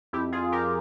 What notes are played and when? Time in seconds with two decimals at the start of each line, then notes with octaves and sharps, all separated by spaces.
0.13 F2 E4 G4
0.32 F2 F4 G#4
0.52 F2 G4 A#4